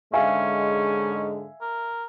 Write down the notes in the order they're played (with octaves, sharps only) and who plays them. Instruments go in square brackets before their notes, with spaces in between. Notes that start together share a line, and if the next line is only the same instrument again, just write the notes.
[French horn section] G#2 D3 G#3 [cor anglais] C#4 [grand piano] E5 F5 G#5
[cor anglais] A#4